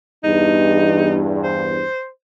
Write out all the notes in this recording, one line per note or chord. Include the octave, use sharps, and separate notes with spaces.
E2 G2 D#4
C5